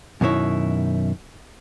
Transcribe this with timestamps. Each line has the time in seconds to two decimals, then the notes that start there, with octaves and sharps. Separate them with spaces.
0.21 F#2 B2 D#3 E4 C#5